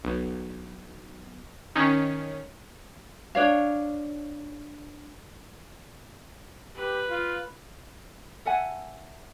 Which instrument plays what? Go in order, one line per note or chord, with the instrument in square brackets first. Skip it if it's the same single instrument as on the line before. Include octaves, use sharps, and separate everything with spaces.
[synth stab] B1
D#3 C#4
[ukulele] D4 C#5 F5
[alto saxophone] G4 [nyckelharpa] B4
[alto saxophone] F4
[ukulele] A4 E5 F#5 G#5